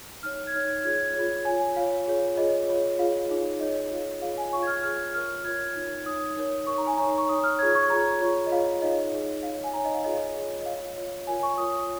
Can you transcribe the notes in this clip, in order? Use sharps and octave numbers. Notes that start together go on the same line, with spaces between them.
D#4 C#5 F6
G#6
D#4 C#5 F6
F4 G#4 C#5 G#6
F4 G#4 C#5
F4 C#5 G#5
F4 C#5 F5
F4 G#4 C#5
F4 G#4 C#5 D#5
F4 G#4 C#5
F4 G#4 C#5 F5
D#4 G#4 C#5
D#4 G#4 C#5 D#5
F4 G#4 C#5
F4 G#4 C#5 F5
G#5
F4 G#4 C#5 C#6
G#6
F6
F4 G#4 C#5 F6
F4 A#4 C#5 F6
F4 A#4 C#5 G#6
D#4 C#5
D#4 C#5 D#6
D#4 A#4 C#5
D#4 A#4 C#5 C#6
A#5
G#5
D#4 C#5 A#5
A#5
C#6
D#4 C#5 D#6
F6
F4 G#4 C#5 G#6
C#6
F4 G#4 C#5 A#5
F4 G#4 C#5
D#5
F4 G#4 C#5 F5
D#4 G#4 C#5 D#5
D#4 G#4 C#5
D#4 C#5 F5
G#5
D#4 C#5 A#5
D#5
F5
F4 G#4 C#5 D#5
F4 G#4 C#5
D#5
F4 C#5 F5
F4 C#5
F4 A#4 C#5 G#5
C#6
F4 A#4 C#5 D#6